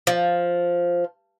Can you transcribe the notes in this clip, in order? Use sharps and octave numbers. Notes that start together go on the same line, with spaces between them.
F3